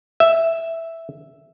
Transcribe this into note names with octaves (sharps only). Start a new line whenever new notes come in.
E5